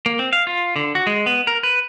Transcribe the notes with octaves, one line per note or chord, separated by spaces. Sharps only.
A#3
C4
F5
F4
D3
F#4
G#3
B3
A#4
B4